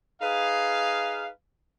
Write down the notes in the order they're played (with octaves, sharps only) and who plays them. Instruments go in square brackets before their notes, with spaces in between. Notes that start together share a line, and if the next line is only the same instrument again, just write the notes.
[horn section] D#4 G#4 B4 F5